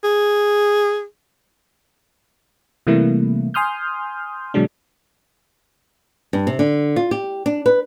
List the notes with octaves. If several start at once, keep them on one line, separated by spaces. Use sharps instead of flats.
G#4
C3 E3 G3 A3 A#3 E4
G#5 C6 D#6 F6 G6
B2 D3 F#3 G#3 D4
G2
C3
D3
F4
G4
D4
B4